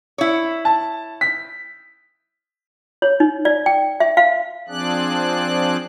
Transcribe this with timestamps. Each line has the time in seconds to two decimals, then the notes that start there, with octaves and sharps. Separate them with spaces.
0.18 E4 C#5
0.65 A5
1.21 B6
3.02 C#5
3.20 D#4
3.45 D5
3.66 G5
4.00 E5
4.17 F5
4.68 F3 C4 D4 G#4 D5 F#6